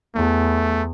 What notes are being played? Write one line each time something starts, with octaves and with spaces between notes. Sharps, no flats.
E2 A3